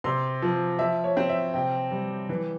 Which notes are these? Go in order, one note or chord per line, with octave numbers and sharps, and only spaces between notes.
C3 C6
F3
F3 E5
C#5
C4
E5
C3 G5
G3
E3